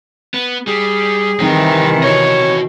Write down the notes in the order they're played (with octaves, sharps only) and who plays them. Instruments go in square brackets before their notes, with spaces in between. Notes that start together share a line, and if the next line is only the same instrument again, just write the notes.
[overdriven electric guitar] B3
[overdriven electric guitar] G3 [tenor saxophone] G#4
[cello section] C3 D#3 E3 [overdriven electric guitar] G3 C4
[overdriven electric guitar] F#4 D#5 [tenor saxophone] C#5